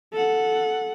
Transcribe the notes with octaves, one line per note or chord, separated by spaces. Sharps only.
A4 F#5